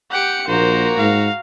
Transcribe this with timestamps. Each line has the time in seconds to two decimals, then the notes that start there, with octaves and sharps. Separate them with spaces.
0.11 G4 F#5 G5 C#7
0.47 A#1 A#3 F#4 C5 A#5
0.98 G#2 F5